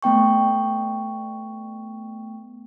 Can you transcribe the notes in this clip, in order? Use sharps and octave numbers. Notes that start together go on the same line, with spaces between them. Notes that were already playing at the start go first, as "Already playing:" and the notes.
A3 B3 G5 C#6